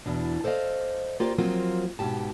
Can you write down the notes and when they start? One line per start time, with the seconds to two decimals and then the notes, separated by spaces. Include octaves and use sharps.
0.06 E2 B2 D4
0.44 A4 C5 D5 D#5 F5
1.20 A#3 F4 G4 C5 D5
1.38 F3 F#3 A#3 C4 F4
1.99 G#2 B2 G4 A5